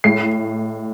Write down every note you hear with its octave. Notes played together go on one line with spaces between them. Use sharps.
A2 C7